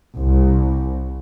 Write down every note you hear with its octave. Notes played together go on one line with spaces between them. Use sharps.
C2